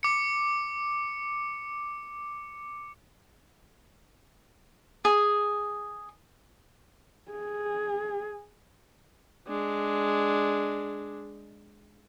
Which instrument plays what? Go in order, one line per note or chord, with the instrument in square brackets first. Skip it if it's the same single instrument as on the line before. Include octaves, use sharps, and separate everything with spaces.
[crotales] D6 C#7
[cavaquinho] G#4
[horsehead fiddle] G#4
[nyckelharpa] G#3 D4